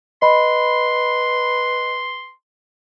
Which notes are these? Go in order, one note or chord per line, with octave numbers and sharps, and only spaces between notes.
B4 D#5 B5 C6